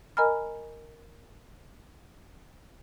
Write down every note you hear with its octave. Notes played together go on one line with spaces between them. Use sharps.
A#4 D#5 G#5 A#5 B5 F6